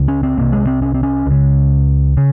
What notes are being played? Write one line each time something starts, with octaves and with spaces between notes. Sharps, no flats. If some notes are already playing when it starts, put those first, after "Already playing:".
Already playing: C#2 C#3
C#4
C4
C2 C3 A#3
G#3
C4
C#4
C4
C#4
C#2
C#3
C#3